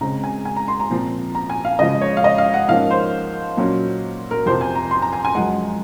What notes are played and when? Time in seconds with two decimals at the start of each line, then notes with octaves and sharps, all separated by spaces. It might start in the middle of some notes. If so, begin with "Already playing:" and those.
0.01 C#3 G#3 C4 A#5
0.24 G#5
0.45 G#5
0.56 A#5
0.68 C6
0.80 A#5
0.90 A#2 F3 C4
1.35 A#5
1.50 G#5
1.65 F5
1.79 C#3 F3 G#3 D#5
2.01 C#5
2.17 F5
2.24 D#5
2.38 F5
2.54 F#5
2.68 G#2 F3 A#3 C#4 F5
2.90 C5
3.57 A#2 F#3 C#4
4.31 A#4
4.46 F2 C3 F3 C5
4.61 G#5
4.75 A#5
4.91 C6
5.02 A#5
5.13 G#5
5.25 G#5
5.35 F#2 F3 G#3 F#5